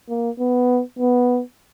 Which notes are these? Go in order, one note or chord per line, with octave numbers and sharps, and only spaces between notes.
A#3
B3
B3